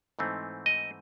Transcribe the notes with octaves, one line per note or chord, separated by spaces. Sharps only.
G#2 E3 A3 C4 D#4
D#5